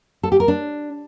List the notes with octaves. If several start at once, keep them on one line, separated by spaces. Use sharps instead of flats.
A4
G4
A#4
D4